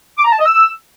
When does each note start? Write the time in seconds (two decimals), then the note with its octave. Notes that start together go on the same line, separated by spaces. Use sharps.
0.18 D6
0.25 A#5
0.32 A5
0.39 D#5
0.46 E6